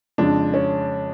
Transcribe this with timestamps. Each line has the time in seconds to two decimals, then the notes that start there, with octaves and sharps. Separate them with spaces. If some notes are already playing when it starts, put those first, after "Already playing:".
0.18 F2 C#3 G#3 D4
0.54 C#4